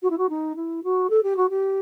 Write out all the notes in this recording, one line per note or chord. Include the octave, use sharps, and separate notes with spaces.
F#4
E4
F#4
D#4
E4
F#4
A4
G4
F#4
G4